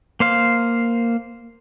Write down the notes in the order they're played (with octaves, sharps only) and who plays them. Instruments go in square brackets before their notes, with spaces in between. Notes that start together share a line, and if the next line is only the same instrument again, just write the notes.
[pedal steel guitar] A#3 C5 F5